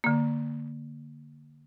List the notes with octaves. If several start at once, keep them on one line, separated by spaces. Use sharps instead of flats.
D3 A#3